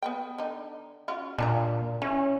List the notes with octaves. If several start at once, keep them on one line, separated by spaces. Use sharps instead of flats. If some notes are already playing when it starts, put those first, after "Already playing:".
B3 B4 G5
D3 D#4
C#4 F4 F#4
A#2 D4 A5 A#5
E3 C#4